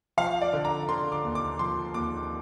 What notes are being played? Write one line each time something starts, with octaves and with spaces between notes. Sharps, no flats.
F3 F5
D5
D3
A#5
D3 C6
D6
D#2
D6
F3 C6
D#2 D6